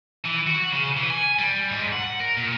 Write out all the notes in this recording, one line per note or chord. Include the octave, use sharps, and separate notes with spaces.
E3
F#4
C#3
E3
G#5
G3
G#2
F#5
A#4
A#2